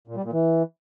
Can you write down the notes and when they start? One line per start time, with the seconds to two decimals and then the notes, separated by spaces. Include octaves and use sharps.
0.08 A#2
0.16 G3
0.24 A#2
0.33 E3